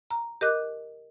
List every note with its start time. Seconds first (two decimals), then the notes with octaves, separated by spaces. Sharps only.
0.10 A#5
0.41 G4 A#4 D#5 D6 F#6